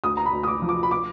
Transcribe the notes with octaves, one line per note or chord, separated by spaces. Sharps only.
D2 D#6
A#5
B5
D2
D#6
D6
F3
D6
B5
D6